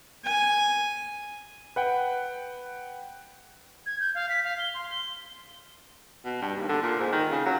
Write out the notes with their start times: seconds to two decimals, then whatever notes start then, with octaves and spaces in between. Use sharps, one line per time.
0.24 G#5
1.76 B4 F#5 G5
3.86 G#6
4.00 G6
4.15 F5
4.29 B6
4.44 F5
4.59 G7
4.74 C6
4.91 G7
6.25 B2
6.41 G2
6.56 D#2
6.69 D3
6.83 A#2
7.00 G#2
7.12 D#3
7.31 C#3
7.46 F#3